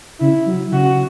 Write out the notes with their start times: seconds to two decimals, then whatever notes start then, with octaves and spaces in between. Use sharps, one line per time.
0.20 C#3 E4
0.46 F#3
0.72 C#3 F#4